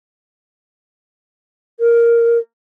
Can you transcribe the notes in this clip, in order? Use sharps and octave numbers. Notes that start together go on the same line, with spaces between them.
A#4